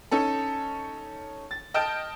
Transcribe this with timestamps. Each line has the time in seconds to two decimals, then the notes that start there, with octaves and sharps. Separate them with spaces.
0.11 C#4 D#4 A4
1.51 A6
1.74 D#5 G5 A5 F6 G6 D7